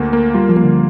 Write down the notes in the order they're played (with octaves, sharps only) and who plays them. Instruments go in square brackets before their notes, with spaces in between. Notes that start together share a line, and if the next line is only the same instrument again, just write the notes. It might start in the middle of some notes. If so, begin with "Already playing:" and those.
Already playing: [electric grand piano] D2 A#3
A#3
[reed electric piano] G3 [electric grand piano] F4
[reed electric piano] F3
[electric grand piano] A#3
[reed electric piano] D3